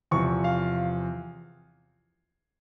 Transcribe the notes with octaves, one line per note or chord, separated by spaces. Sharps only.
E2 C3 F3 C#6
F5